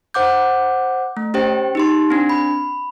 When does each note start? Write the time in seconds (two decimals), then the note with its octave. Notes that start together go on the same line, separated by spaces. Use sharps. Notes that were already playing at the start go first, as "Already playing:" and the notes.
0.14 C5 F#5 D6 G6
1.17 A3
1.34 C#4 G4 C5 G5
1.75 D#4 G4 C6
2.10 C4 D4
2.29 B5